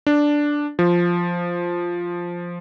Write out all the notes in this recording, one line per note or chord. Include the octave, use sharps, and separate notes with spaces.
D4
F3